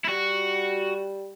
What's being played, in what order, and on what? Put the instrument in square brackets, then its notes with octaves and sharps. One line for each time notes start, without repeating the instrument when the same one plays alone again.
[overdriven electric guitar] E4
[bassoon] G3 [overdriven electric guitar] F#4